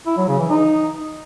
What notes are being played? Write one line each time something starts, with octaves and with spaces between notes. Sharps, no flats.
E4
F#3
C#3
E3
D#4